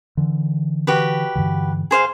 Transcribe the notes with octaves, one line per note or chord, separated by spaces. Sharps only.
D3 E3
F#4 G4 B4
G2 D3 E3
G#4 C5 F5